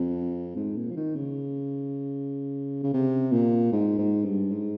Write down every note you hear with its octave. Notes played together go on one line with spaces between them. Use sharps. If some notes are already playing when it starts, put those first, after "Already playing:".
Already playing: F2
G#2
A#2
F3
D#3
C#3
C#3
C3
A#2
G#2
G#2
G2
G#2